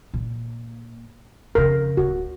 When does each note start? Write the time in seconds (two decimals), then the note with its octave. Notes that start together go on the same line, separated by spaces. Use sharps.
0.14 A#2
1.55 F2 C#3 A#4
1.97 D1 F#4